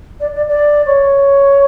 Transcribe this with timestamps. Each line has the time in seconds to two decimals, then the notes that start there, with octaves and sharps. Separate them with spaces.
0.20 D5
0.35 D5
0.49 D5
0.86 C#5